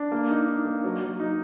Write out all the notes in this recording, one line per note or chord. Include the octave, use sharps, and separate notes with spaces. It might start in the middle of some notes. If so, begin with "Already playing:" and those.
Already playing: D4
A#3
D#4
D#4
A#3
F#3
F#3
D#4